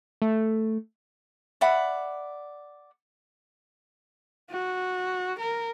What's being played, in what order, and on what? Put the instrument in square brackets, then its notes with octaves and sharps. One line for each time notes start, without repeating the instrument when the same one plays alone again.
[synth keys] A3
[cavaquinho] D5 E5 F#5 B5
[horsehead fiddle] F#4
A#4